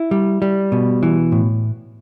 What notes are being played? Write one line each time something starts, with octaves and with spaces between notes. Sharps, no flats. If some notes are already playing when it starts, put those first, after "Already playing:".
Already playing: E4
G3
G3
B2
E3
A2